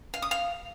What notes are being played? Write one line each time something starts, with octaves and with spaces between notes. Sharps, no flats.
F5
D#6
F5